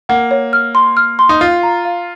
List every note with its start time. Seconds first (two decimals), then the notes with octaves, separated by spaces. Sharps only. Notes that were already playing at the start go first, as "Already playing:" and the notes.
0.09 A#3 F#5
0.31 C#5
0.53 F6
0.75 C6
0.97 F6
1.19 C6
1.29 D#4
1.41 F4 F5
1.63 A#5
1.85 F5